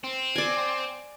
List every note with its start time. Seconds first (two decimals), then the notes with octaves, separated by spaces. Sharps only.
0.04 C4
0.36 D5 G#5